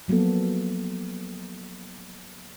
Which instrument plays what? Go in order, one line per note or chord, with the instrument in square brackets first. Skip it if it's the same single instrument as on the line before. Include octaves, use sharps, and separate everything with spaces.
[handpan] F3 F#3 A#3 B3 A4